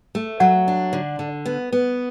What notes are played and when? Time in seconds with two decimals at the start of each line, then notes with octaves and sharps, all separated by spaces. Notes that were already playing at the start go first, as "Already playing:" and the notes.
0.15 A3
0.40 F#3 F#5
0.68 D4
0.93 D3
1.19 D3
1.46 B3
1.72 B3